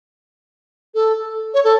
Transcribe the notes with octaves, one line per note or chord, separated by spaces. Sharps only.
A4
C#5
A4